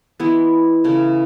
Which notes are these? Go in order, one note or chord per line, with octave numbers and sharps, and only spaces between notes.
E3 G#3 B3 E4
C#3 E3 A3